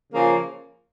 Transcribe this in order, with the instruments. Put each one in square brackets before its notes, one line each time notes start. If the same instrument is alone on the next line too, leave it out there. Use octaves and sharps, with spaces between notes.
[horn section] C#3 F3 A#3